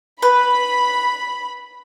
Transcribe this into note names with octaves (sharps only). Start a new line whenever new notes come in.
B4 B5